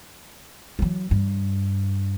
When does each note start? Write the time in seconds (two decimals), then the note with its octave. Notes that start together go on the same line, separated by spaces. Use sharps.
0.79 E3 F#3
1.11 G2